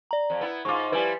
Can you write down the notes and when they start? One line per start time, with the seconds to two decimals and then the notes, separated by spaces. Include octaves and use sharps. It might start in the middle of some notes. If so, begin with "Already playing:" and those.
0.11 D5 A#5
0.30 F2
0.41 B3 E4
0.65 G#2 F4 C#6 D6
0.92 F3 G3 E4 B4 G#5